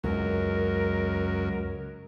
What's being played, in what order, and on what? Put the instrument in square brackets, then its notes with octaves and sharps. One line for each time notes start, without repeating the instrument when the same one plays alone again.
[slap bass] C#2 [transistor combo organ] F#2 [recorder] A#4